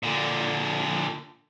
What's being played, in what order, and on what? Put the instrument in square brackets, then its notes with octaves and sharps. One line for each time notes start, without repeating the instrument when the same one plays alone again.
[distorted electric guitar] A#2 D3